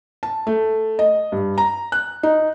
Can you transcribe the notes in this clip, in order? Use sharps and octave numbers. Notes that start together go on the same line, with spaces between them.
A5
A3
D#5
G2
A#5
F#6
D#4